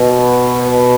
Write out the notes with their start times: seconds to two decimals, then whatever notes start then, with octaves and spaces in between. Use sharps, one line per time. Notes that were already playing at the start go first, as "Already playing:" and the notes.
Already playing: B2
0.62 B4